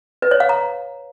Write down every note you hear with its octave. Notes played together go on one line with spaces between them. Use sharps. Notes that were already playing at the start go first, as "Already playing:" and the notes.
B4
C#5
F5
A#5